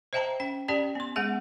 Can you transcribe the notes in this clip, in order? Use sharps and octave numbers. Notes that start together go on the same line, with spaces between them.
C5 D#5 E5 G5 A5 A#5
C#4 G5
C#4 G4 D5 G5 A5
B3 C6
G#3 B3 G#4 E5 F#5